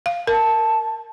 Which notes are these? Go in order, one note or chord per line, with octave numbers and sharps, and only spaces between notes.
F5
A#4 A5